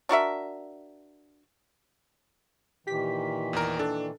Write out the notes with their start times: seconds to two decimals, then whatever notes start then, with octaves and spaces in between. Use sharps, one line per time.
0.09 D4 F#4 A#4 E5
2.87 A#2 D#3 E3 G4 B6
3.53 E2 A#4
3.79 D4 A4